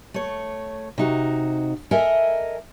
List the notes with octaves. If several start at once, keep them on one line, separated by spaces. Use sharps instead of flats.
A3 C#5
C3 D#4 F#4
A4 A#4 D#5 E5 G#5